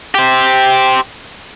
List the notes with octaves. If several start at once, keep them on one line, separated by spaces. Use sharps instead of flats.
G4 C5